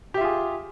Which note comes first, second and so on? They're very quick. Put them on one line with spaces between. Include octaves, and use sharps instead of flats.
G4 E5 F4 G#4